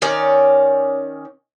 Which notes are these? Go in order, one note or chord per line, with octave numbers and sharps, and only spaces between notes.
D#3 C#4 D5 A#5